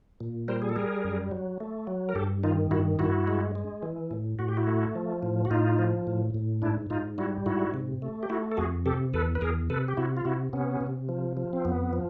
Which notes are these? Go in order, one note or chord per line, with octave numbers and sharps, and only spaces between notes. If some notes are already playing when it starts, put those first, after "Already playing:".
A#2
G3 A#4 C5
G#4
A4
G3 G#4 A#4
F#2
F#3
A3
F#3
A#4
G2 G4 A4
D#3 D#4 F4
G2 E4 F#4
G2 E4 F#4
G#3
G#3
E3
A2
A2 F#4
G4
E4 F#4
A3
F3
A2
F#4
A2 D#4 F4
F3
A2
A2
G#2 D4 E4
G#2 D#4 F4
G3 E4 F#4
G#2 E4 F#4
C3
A3
G4
A3 E4 F#4
A4
F2 F#4 G#4
C3 G4 A4
E2 A4 B4
B4
E2 G#4 A#4
C3 A4 B4
G4
C3 E4 F#4
F4
C3 E4 F#4
C3 B3 C#4
C3
F3
F3
C4
F2 B3
F3